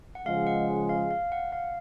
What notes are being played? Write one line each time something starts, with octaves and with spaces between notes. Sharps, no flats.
F#5
C#3 F3 G#3 F5
F#5
F5
F5
F#5
F5